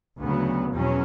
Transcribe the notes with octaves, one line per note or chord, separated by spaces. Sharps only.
D2 C#3 F#3 B3
E2 B2 F#3 C#4